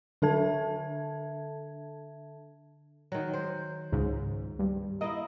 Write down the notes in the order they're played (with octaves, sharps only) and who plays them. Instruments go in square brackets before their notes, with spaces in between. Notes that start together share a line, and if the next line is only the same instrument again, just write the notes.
[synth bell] D3 D4 A4 E5 A5 G#6
[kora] D#3 F#3
C5
[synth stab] C#2 G#2
G2
[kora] A#3 E4 [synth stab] D#5